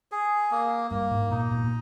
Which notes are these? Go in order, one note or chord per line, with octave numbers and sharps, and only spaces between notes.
G#4
A#3
G2 A#3
G#2
A#2 D#4
A#2
A#2